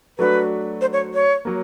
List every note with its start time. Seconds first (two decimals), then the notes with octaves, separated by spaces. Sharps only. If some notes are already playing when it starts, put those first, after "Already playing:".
0.19 F#3 A3 D4 F#4 B4
0.81 C5
0.93 C#5
1.14 C#5
1.45 F#3 A#3